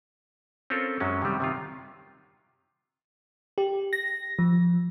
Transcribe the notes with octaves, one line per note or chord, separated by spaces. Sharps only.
C4 C#4 F4 A4 A#4
F#2 F#3 G#3 C#4
C3 D#3 F#3 G3
C3 D#3 F4
G4
A#6
F3